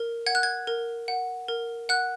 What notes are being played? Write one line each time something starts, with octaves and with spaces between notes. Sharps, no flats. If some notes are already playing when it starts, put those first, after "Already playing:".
Already playing: A#4
F#5 G#6
F#6
G#6
A#4
F#5
A#4
F#5 F#6